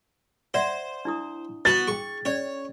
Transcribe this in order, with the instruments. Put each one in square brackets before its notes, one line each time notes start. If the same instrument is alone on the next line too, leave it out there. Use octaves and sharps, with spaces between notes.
[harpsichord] C5 [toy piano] D5 E5 F#5
[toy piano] D4 E4 D#6
[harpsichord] B3 F#4 [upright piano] A6
[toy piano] G#4 G5 [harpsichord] C#6
[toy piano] C#4 D5 [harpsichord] C#5